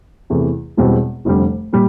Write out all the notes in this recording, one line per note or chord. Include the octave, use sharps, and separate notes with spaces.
E2 C3 E3 A3 C4
E1 E2 B2 G3 C4
F1 F2 D3 G3
A#2 G3